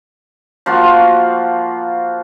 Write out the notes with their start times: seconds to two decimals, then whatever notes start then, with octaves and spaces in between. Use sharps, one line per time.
0.66 F3 A#3 F4 F#4